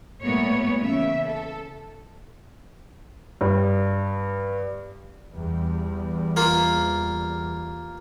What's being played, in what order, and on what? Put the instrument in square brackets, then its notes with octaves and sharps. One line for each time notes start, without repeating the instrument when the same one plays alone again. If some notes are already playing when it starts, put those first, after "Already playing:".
[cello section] A#2 G3 A3 B3 C#5
C#3 E3 E5
A4
[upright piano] G2
[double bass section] E2 G3
[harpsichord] A#3 F4